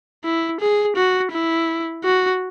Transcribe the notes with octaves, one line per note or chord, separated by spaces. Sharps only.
E4
G#4
F#4
E4
F#4